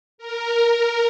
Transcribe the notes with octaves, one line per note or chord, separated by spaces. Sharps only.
A#4